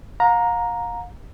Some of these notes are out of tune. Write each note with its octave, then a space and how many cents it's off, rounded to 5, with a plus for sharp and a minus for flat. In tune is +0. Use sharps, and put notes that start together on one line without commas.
F5 +40 A#5 +5